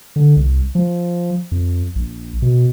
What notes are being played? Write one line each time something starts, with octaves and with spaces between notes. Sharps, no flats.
D3
C2
F3
F2
A#1
B2